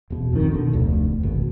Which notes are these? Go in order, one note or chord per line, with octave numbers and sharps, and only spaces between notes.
E1 B2
G1 F2 A#2 D#3
B2 D3
F1 D2
G#1 B2